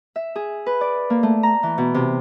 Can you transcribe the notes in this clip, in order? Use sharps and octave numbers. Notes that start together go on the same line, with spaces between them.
E5
G#4
B4
D5
A#3
A3
A#5
E3
B2
C3